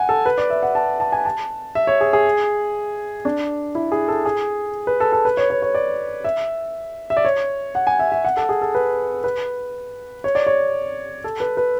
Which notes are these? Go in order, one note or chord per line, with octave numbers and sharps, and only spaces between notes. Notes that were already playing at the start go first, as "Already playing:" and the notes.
Already playing: F#5 G#5
A4
B4
D5
E5
F#5
A5
A5
G#5
A5
E5
C#5
G#4
G#4
D4
E4
G#4
A4
G#4
B4
A4
A4
B4
C#5
C#5
C#5
D5
E5
E5
D5
C#5
F#5
G#5
E5
E5
F#5
A4
G#4
A4
B4
B4
C#5
D5
C#5
A4
B4
B4